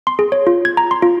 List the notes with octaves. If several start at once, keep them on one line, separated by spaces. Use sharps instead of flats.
C6
G#4
C#5
F4
G#6
A#5
C6
F4